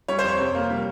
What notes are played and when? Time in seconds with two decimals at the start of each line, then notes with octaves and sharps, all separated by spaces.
0.08 G3 C#5
0.19 C5
0.24 F2 C#5
0.39 C3
0.55 A#3
0.70 G3